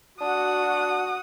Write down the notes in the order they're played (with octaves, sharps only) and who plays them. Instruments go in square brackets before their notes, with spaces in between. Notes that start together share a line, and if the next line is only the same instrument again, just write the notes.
[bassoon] D4 [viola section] F#4 F#5 [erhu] D#6